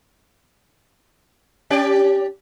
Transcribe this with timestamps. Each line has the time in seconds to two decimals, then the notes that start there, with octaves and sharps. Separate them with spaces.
1.70 C#4 G4 D5